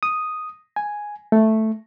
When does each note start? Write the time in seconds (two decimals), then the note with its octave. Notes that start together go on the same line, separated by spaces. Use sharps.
0.03 D#6
0.76 G#5
1.32 A3